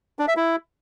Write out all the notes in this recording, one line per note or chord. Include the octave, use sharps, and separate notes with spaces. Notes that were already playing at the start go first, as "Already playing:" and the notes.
D4
E5
E4